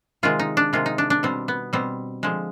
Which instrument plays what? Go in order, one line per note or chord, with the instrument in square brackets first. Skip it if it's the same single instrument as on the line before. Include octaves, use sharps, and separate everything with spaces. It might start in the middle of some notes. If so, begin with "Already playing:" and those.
[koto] C3 D#3 G#3 F4
D#4
D4
C3 D#3 G#3 F4
D#4
D4
D4
B2 G3 C4
B3
B2 G3 C4
D3 F3 G#3